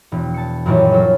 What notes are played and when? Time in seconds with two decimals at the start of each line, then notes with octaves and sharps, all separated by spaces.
0.12 E1
0.34 A5 C#7
0.66 F#2 A#2 D#3 E3 F#3 G3
0.92 F#3 F4 A4